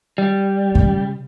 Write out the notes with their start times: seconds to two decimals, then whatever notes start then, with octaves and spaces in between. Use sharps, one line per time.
0.18 G3
0.75 C#3